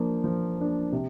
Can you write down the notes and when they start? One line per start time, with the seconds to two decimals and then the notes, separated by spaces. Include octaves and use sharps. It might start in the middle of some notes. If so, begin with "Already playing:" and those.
Already playing: F3 A#3 D4
0.24 F3
0.58 A#3 D4
0.92 C3